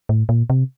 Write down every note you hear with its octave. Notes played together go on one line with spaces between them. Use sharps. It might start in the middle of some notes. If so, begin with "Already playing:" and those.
A2
A#2
C3